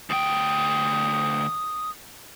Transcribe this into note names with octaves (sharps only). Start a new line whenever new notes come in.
D2 G5 D#6